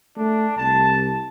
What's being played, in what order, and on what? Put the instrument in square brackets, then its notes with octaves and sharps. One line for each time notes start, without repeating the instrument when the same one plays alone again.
[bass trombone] A3 [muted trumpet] D4
[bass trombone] C2 [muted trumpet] A5